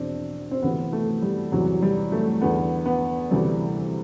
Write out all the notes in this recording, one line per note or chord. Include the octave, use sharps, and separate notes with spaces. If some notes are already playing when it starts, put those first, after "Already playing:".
Already playing: E2 B2 C4 D4
C4
D2 C3 E3 B3
A3
G3
E2 C3 E3 F#3
G3
A3
E2 D3 B3
B3
D2 C3 E3 G3